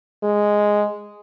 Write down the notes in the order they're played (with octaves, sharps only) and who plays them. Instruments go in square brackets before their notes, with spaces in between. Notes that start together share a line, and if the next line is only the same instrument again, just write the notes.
[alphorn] G#3